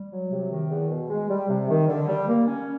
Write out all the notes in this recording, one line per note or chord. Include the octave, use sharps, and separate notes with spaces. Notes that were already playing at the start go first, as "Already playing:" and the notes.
Already playing: G3
F#3
C3
D#3
E2
B2
G#3
G3
C3
D#3
D3
G3
A#3
C#4